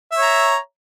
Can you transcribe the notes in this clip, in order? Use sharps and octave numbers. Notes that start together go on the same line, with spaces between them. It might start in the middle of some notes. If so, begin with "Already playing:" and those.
C#5 E5 A#5